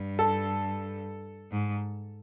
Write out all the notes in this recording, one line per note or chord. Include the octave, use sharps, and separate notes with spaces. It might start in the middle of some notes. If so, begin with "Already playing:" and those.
Already playing: G2
A4
G#2